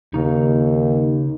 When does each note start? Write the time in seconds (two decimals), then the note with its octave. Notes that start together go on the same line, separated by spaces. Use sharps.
0.14 D#2 C#3 D#4